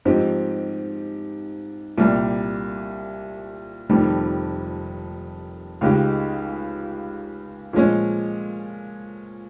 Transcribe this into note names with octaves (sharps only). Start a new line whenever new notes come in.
G#2 F3 C4 D#4 G4
C2 A#2 G3 A#3
F1 F2 D#3 G3
C#2 C#3 G#3 D#4 G4
A#2 F3 G#3 C#4